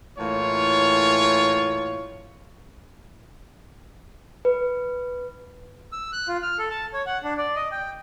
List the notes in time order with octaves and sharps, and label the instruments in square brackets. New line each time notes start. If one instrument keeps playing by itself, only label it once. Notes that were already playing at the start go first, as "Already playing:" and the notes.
[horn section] A2 E3 A#3 F4 C#5
[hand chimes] B4
[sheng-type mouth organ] E6
F#6
F4
F6
A4
A5
C#5
F#5
D4
D5
D#5
G5